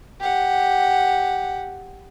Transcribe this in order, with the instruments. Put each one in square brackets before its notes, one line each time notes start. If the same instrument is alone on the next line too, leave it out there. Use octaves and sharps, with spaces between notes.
[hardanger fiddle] G4 F#5